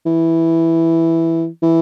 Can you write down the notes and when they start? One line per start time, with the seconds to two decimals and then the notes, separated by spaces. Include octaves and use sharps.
0.06 E3
1.62 E3